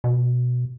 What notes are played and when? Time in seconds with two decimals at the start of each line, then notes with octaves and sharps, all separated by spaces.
0.04 B2